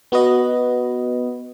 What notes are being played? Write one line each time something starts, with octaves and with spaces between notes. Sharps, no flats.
B3 F#4 B4 D#5